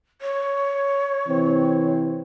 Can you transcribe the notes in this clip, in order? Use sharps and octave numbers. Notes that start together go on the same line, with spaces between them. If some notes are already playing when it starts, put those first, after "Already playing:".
C#5
C3 E3 C4